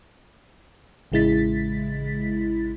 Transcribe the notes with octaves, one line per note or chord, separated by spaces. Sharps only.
A1 C#3 G#3 E4 A6 B6